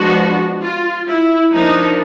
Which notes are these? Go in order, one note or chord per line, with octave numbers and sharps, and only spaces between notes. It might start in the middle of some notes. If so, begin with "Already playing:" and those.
Already playing: F3 G#3 B3 D4 F#4
F4
E4
F3 A#3 D4 D#4